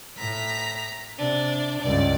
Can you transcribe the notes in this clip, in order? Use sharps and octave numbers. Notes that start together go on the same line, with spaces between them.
A2 A#5 B6
C3 D4
C#2 G2 D5